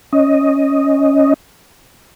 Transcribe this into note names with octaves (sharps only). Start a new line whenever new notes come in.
C#4 D#5